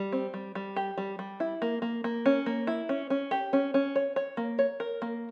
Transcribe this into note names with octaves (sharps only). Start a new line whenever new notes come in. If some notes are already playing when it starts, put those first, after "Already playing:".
Already playing: G3
C4
G3
G3
G4
G3
G3
E4
A#3
A#3
A#3
C#4
A#3
E4
C#4
C#4
G4
C#4
C#4
C#5
C#5
A#3
C#5
A#4
A#3